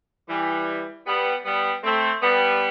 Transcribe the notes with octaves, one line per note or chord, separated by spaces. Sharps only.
E3 G3
G3 B3
G3 B3
A3 C4
G3 B3